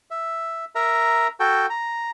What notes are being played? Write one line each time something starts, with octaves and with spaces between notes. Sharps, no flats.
E5
A#4 E5 A#5
F#4 A4 G5
A#5